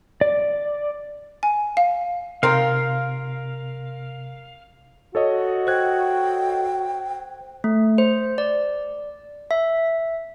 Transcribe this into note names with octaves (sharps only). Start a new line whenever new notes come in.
D5
G#5
F5
C3 D#3 C4 F4 A#4 F5
F#4 A4 C#5 D#5
C5 G5 F#6 G#6
A3
C5
D5
E5